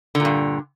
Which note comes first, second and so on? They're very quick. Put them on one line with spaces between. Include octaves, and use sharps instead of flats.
D3 A#2 G2